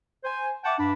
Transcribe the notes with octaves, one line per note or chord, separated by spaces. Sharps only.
C5 G#5
E5 F#5 G5 A5 C#6 D6
G2 D4 B5